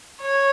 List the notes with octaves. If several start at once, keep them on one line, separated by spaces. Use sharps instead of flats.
C#5